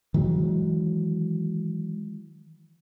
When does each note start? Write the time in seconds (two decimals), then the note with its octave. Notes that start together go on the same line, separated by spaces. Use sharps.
0.14 D#3 E3 F#3 G#3